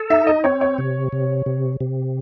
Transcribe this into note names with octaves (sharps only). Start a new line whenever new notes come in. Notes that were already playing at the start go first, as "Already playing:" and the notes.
Already playing: A4
D#4 E5
D#5
C4 C#5
C#5
C3
C3
C3
C3